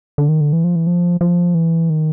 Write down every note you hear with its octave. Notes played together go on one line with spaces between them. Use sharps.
D3
D#3
D3
E3
F3
E3
F3
F3
E3
D#3